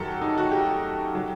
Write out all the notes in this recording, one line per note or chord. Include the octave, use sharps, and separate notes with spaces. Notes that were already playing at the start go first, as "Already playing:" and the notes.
Already playing: F#2 D#3 F#3 G4 A4 A#4
D#4
F#4
G4
F#3